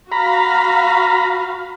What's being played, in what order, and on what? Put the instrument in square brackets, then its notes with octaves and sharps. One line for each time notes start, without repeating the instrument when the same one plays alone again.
[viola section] F#4 F5 [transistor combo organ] A#5 B5